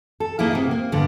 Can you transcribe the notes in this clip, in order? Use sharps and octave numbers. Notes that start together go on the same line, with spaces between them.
A4
A#3 D#4 E4 G#4
C3 A#3 B3
A#3
G2 D3 B3